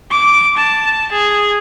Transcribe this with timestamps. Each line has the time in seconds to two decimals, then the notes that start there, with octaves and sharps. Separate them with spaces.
0.11 D6
0.57 A5
1.12 G#4